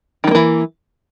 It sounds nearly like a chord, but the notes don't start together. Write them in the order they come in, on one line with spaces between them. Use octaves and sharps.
D#3 A3 A#3 E3